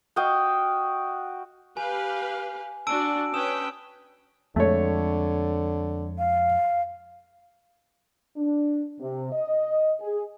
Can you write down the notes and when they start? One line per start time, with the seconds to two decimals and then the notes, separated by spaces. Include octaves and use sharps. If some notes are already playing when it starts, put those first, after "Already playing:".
0.16 F#4 D#5 F5 G5
1.77 G4 B4 F5 G#5
2.87 D4 F#4 A5 E6 D7
3.34 C#4 B4 G5 D#6 E7
4.56 F2 D3 G#3 A3 C#5
6.19 F5
8.37 D4
9.00 C3
9.32 D#5
10.01 G#4